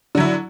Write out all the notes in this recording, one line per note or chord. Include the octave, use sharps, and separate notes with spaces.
D3 F#3 E4